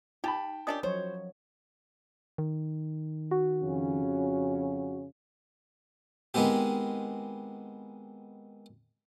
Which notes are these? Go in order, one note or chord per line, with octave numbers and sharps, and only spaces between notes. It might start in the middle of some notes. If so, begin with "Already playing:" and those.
D#4 G4 G5 A5 B5
C#4 D4 G4 A#4 D#5 D#6
F3 F#3 C5 C#5
D#3
F#4
F2 C#3 C#4
D#3 G#3 B3 C4 G4